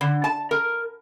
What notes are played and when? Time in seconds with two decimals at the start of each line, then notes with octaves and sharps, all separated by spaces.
0.01 D3
0.24 A5
0.51 A#4